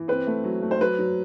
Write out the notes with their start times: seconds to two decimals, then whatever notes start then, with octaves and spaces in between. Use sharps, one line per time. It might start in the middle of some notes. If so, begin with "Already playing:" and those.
Already playing: E3
0.08 C4 B4
0.27 A3
0.44 F#3
0.62 A3
0.71 C5
0.81 F#3 B4
0.99 F#3